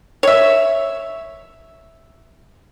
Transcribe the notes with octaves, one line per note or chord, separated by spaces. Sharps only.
C#5 E5